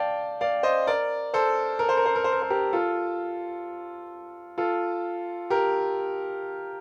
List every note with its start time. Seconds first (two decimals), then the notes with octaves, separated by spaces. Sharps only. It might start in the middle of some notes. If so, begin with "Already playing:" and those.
Already playing: D5 F5 G5 A5
0.41 D5 F5
0.63 C5 D#5
0.87 A#4 D5
1.34 A4 C5
1.79 A#4
1.89 C5
1.97 A#4
2.06 C5
2.16 A#4
2.24 C5
2.33 A#4
2.42 C5
2.50 G4 A#4
2.73 F4 A4
4.58 F4 A4
5.50 G4 A#4